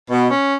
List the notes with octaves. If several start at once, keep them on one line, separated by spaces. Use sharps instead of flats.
B2
C#4